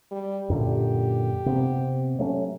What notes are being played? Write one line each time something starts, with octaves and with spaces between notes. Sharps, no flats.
G3
F#2 A#2 D3 G4
C3 B3 C4
F#3 A3 C#4